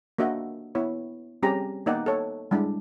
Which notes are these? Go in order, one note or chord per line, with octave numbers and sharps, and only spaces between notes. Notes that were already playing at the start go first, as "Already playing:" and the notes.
A#3 D4 F#4 D#5 E5
B3 E4 C#5
G3 C4 C#4 G4 G#4 A#5
A#3 B3 D#4 D5 F#5 G5
A4 C#5
G3 G#3 D4 E4